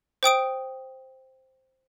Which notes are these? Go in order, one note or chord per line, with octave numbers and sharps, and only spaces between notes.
C5 G5 D#6 D7